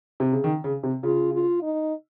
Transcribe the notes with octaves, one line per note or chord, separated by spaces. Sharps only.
C3
C#3
D#3
C#3
C3
C#3 F4
F4
D#4